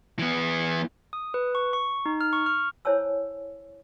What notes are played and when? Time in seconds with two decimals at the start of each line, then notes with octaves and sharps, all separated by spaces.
0.19 E3 B3
1.13 D#6
1.34 B4
1.55 C#6
1.73 C#6
2.06 D#4
2.21 F6
2.33 C#6
2.46 F6
2.85 E4 C5 C#5 G#5 A5 E6